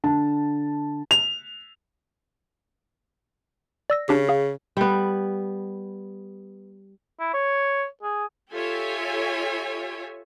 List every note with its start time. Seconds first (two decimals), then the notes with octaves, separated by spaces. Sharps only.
0.04 D3 A5
1.11 F7
3.90 D5 E6 A#6
4.09 C#3 D4 G4
4.29 G#4 F5
4.77 G3 B3
7.19 E4
7.34 C#5
8.03 G#4
8.53 F4 G4 A4 C#5 E5 G#5